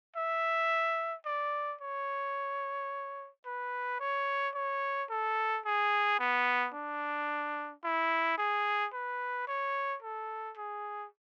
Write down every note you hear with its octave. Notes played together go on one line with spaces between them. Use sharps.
E5
D5
C#5
B4
C#5
C#5
A4
G#4
B3
D4
E4
G#4
B4
C#5
A4
G#4